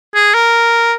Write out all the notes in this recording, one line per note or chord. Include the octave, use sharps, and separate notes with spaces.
G#4
A#4